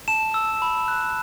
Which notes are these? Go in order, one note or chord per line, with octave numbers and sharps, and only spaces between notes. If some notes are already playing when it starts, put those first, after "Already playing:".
A5 E7
E6
B5
F#6